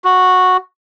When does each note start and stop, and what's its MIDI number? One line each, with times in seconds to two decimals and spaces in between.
0.04 0.57 66